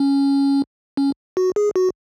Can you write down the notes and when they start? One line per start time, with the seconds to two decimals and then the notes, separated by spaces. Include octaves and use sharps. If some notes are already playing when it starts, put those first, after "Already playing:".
Already playing: C#4
0.97 C#4
1.37 F#4
1.56 G#4
1.76 F#4